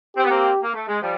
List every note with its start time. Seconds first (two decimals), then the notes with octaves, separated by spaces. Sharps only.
0.16 C4 G4
0.24 B3
0.30 A#3 C4
0.62 A#3
0.75 A3
0.88 G#3
1.01 F3 G3